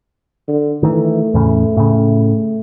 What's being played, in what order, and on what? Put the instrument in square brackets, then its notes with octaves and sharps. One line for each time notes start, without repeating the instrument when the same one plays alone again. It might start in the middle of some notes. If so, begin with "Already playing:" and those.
[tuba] D3
[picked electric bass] D#3 E3 [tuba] A3
[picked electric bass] E2 A2 C#3
A2 C#3